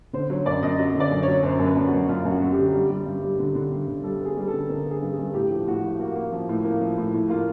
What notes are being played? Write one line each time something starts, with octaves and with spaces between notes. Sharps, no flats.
D3 C5
F#3 C#5
F#2 D5
F#2 D#5
F#3 D#5
D3
D5
F#2
C#5
F#3
F#2 C5
F#2
B4
F#2
F#4
F#2
F#2 F4
F#2
F#4
F#3
G4
D3
G3
G3
G2
G3
D3
D3
G3
D3
G3 A4
B3 G#4
G3
A4
D3
D3 A#4
B3
G#4
G2
G#4
G2
A2 G4
F3
A2 F#4
F3
A#3 F#4
A#3
F3
A2
A#3
F3
A2
A2
A#3 F4